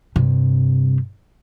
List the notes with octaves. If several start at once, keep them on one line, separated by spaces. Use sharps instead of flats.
G2 C3